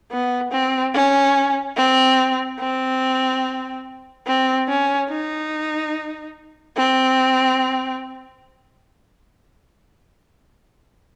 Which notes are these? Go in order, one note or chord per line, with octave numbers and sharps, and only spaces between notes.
B3
C4
C#4
C4
C4
C4
C#4
D#4
C4